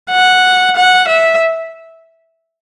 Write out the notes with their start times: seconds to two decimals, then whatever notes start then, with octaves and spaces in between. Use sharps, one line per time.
0.11 F#5
0.76 F#5
1.07 E5